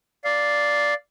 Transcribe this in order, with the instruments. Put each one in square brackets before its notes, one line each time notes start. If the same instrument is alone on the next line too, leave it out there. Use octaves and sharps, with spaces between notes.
[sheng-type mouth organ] D5 F5